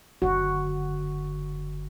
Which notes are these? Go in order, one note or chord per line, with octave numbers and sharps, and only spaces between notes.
F#1 D3 F#4